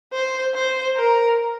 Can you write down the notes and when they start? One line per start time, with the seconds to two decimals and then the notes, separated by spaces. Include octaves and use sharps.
0.13 C5
0.55 C5
0.97 A#4